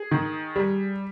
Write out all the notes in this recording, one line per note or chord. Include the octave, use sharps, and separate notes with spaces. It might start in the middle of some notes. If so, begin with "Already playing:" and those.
Already playing: G#4
D#3
G3